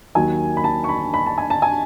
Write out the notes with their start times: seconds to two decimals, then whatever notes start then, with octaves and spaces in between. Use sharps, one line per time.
0.15 D#2 D#3 F#3 G#5
0.57 B5
0.64 A5
0.84 C#6
0.89 B5
1.14 B5
1.26 A5
1.38 G#5
1.50 A5
1.62 G#5